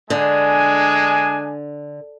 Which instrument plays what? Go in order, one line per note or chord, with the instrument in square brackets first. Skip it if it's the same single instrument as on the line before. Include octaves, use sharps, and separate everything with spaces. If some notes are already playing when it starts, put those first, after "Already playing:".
[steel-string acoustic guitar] D3 [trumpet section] G#3 D4 G#5